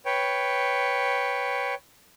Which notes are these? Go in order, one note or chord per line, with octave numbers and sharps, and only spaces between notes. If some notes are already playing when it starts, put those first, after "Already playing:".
B4 C#5 G5